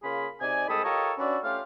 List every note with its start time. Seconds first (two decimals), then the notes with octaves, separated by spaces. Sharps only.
0.03 C#3 A#3 F4 G#4 B5
0.41 C3 D#4 D5 G#5
0.69 C2 G#3 A4 G5 B5 D#6
0.84 F4 G4 A4 A#4 C#5 D#5
1.18 C#4 D4 F#4 B4 D5 E5
1.44 A3 C#4 F4 G4 F5